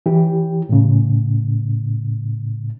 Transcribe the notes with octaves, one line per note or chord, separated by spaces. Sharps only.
E3 G4
A2 C#3